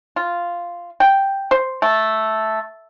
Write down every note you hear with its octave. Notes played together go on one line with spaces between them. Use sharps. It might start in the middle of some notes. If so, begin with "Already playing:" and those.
F4
G5
C5
A3